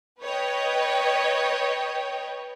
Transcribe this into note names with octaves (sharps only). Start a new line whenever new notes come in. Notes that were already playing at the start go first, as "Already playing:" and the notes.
B4 C#5 D#5 G5